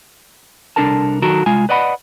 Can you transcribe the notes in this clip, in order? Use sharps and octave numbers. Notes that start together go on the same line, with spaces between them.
C2 F#3 D4 A4 A#4 A5
D#3 F#3 F#4 A4 A#4
C2 G#3 F4 G#5
B4 D5 D#5 F#5 B5